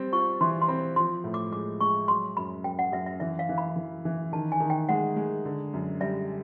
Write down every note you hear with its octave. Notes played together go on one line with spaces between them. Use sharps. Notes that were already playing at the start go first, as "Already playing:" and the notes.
Already playing: G3 C4
F4 C#6
E3 C6
C6
C4 B5
F3 C6
A2
D6
G#3 D6
G#3 C#6
F#3 C6
F#2 B5
F#2 G5
F#5
F#2 E5
E5
E3 E5
F5
E3
B5
E3
E3
D#3 A5
G#5
D#3
G5
G#3 F#5
G#3
D3
F#2
G3 E5